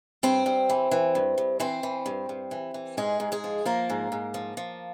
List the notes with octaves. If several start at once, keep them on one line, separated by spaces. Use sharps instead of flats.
G2 C4 C5
G2
E3
E3
G2
G2
E3 C4 C5
E3
G2
G2
E3
E3
G#2 G#3 G#4
G#2
G#3 G#4
F3
F3 A#3 A#4
G#2
G#2
F3
F3